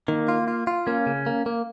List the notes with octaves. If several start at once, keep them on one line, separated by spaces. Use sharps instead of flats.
D#3 A#3
F4
F4
F4
A#3 C#4
C#3
A#3
A#3